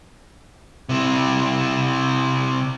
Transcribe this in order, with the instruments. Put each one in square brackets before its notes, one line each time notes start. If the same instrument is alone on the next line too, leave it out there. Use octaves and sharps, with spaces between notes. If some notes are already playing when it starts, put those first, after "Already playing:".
[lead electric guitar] C3 E4